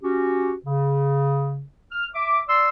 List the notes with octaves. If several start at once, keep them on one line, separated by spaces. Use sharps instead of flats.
C#4 F#4 G4
C#3
F6
E5 D6
D5 C6 E6